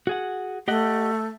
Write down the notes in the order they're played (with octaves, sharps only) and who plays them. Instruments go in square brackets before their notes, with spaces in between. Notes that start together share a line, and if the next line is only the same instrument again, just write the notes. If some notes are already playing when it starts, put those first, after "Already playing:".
[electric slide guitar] F#4 G#4 F#5
[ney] A3 [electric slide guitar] G4 D#5 F#5